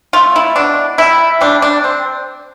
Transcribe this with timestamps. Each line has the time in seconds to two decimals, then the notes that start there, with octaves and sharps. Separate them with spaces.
0.13 A3 F4
0.36 E4
0.56 B2 D4
0.98 G3 E4
1.41 G3 D4
1.62 D4
1.84 C4